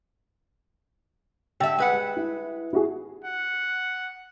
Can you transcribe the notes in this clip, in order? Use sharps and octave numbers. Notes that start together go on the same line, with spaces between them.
D3 E5 G5
G#3 B4 F#5
G5
E4
E4 F#4 G#4
F#5